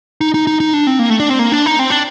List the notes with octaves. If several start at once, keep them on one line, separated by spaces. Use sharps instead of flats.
D#4
D#4
D#4
D#4
D4
C4
A#3
A3
D4
C4
A#3
D4
D#4
C4
D4